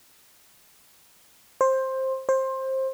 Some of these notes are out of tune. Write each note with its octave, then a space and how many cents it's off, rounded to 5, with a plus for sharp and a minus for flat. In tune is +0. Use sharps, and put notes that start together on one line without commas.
C5 +15
C5 +20